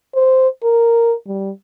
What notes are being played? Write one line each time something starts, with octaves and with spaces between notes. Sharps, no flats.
C5
A#4
G3